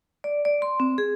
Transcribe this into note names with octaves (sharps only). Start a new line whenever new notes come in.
D5
D5
C6
C4
G#4